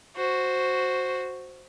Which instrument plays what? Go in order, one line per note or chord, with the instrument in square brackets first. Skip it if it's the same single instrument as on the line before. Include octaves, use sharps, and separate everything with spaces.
[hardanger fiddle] F#4 C5